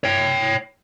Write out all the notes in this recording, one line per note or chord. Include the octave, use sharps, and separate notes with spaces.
C#5 G5